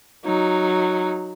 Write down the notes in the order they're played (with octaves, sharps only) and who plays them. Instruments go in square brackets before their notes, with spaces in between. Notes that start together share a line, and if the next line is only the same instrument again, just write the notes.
[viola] F#3 D#4